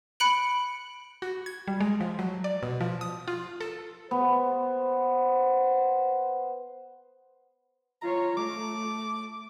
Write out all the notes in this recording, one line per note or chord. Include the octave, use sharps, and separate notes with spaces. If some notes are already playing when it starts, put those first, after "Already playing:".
B5 F#6 C#7 D7 F#7
F#4
G#6
G3
G#3
F3
F#3
D5
B2
F3
D#6
F4
A4
B3 C5
F4 C#5 A#5
A3 D6